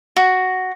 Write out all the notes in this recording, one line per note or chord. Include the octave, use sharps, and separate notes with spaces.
F#4